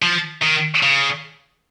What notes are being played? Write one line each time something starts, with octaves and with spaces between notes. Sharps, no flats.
F3
D#3
C#3